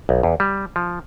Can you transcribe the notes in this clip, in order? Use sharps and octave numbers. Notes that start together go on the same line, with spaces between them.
B1
E2
G3
F3